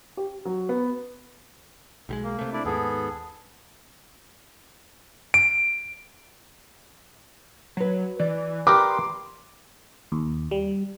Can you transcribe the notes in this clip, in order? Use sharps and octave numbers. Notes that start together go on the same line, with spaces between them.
G4
F#3
B3
B1 G3 G#3
A#3
C3 A3
D4 E4 D5
D#2 G#2 B3 G#4 A4
D7
F#3 F#4 B4
E3 D5
G4 A#4 B4 C6 D6
D#2
G3